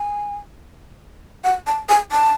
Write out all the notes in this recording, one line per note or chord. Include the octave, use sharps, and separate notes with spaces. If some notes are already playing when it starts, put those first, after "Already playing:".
Already playing: G#5
F#5
A5
G#5
A5